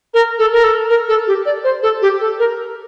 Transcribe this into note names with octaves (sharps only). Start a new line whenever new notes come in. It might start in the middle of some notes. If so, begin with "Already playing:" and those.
A#4
A4
A#4
A4
A#4
A4
G4
D5
C5
A4
G4
A4
A#4